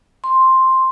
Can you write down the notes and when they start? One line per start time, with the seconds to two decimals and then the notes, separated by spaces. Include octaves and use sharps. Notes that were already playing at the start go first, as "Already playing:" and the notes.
0.24 C6